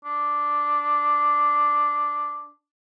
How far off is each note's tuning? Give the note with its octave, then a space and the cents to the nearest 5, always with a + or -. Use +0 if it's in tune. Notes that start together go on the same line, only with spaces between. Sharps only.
D4 +0